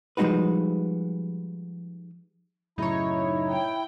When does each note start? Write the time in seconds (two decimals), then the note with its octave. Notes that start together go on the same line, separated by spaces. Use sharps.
0.17 F3 G3 G#3 D#4 F#4 B4
2.78 F#2 A2 C#3 D#4 E4 C#5
3.50 G5